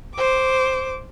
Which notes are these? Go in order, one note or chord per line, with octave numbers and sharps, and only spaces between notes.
C5 D6